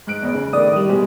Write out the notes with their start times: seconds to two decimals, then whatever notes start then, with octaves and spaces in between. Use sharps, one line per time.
0.07 G#2 F#6 D7
0.22 E1 E2
0.34 C#3
0.53 A2 D#3 D5 D#6
0.76 G3
0.89 B2 G#3 G4